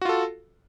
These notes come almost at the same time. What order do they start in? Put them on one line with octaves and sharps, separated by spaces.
F#4 F4 A4